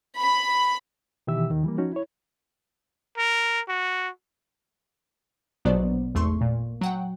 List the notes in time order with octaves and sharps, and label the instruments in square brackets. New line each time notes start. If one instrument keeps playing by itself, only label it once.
[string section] B5
[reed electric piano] B2 D#3 E3 G4 E5 E6
D#2 D#3
E3 G3 A#3
F3 C#4 D#4 F#4
E4 C#5
[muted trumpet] A#4
F#4
[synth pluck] A#1 B2 F#3 B3 C5 D5
G#1 E2 A3 C6 C#6
A#2
F#3 F#5 G5